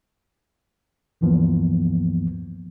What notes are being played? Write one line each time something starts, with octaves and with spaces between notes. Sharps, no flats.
D2 G2 E3 F3 A#3 B3